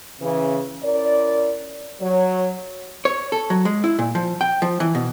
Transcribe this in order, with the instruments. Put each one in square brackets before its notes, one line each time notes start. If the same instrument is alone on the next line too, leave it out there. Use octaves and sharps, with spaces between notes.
[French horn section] C#3 E3
C#4 E4 A#4 D5
F#3 C#5
[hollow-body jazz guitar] C#5
A4
F#3
G#3
E4
A#2
F3
G5
F3
E3
B2